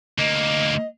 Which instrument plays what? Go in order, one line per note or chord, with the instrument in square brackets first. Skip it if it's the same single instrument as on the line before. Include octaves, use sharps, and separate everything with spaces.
[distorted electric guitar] D2 A#3 [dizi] D#5